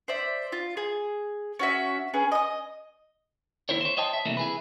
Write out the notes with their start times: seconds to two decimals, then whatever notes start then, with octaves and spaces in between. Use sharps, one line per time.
0.08 C5 D5 E5
0.52 F4
0.77 G#4
1.59 C#4 F#4 E5
2.14 C#4 G#4 B4
2.32 D#5 D#6
3.69 D#2 G3 E4 A#4 C5 C#5
3.81 C5 C#5
3.97 C5 C#5 D#5 G5 A5
4.13 E5
4.26 C3 E3 G3 A3 A#3
4.37 E4 G#4 B4